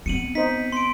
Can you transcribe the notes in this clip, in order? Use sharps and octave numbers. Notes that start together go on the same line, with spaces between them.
B3 C4 C#7 D#7 F#7
D#4 C5 B6
C6 D7